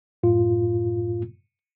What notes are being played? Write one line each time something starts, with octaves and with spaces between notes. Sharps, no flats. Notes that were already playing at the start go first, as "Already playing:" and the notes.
F#2 A2 F4